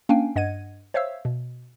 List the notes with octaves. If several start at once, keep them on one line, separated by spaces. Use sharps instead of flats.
A#3 C#4 D4 F5 G5 G#5
G2 D#5 F#5 G#6 D#7
C5 C#5 E5 F5 E6
B2